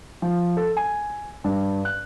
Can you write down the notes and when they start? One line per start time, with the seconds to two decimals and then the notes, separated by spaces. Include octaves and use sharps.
0.22 F3
0.57 A4
0.77 G#5
1.44 G2
1.85 F#6